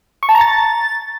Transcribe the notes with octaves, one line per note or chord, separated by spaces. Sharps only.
C#6
A5
A#5
A6